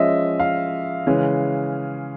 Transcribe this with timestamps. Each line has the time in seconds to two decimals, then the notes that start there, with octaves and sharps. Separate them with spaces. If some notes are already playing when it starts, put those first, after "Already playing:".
Already playing: F3 G#3 C#4 D#5 E5
0.40 F5
1.06 C#3 E3 G#3 C#4